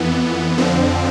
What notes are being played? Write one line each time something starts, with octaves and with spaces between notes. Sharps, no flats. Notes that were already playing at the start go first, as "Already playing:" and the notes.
Already playing: F2 E3 B3
F2 D3 F3 C4